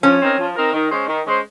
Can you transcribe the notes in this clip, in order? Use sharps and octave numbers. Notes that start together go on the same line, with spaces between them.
F3 C#4
C4 D#4 A#4
F3
C4 D#4 A#4
D#3
G#3 C#4 G#4 C5
D#3
G#3 C#4 G#4 C5